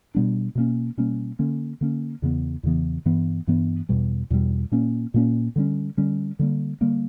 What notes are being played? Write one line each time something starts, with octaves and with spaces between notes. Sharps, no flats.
B2 G3 B3 D4
B2 G3 A#3 C#4
B2 G3 A#3 C#4
D3 A#3 C#4
D3 A#3 C#4
E2 C#3 E3 B3
E2 C#3 E3 B3
G2 E3 B3
G2 E3 B3
E2 B2 G3
E2 B2 G3
A#2 A#3 C#4
A#2 A#3 C#4
D3 G3 C#4
D3 G3 C#4
D3 G3 A#3
D3 G3 A#3